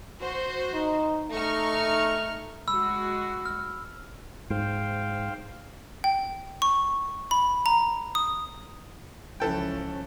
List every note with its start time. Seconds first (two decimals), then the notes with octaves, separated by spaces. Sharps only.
0.21 F#4 C5
0.73 D#4
1.31 A3 D#4 C#6 F6
2.68 G#3 F#4 B5 E6
3.45 F6
4.50 G#2 C5 F5 G5
6.04 G5
6.62 C#6
7.31 B5
7.66 A#5
8.15 D#6
9.40 C#2 E3 F3 C#4 A4 G5